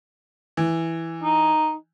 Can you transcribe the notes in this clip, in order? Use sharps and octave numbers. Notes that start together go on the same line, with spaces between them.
E3
D#4